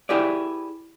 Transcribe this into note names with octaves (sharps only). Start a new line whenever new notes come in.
E4 G4 G#4 B4 D5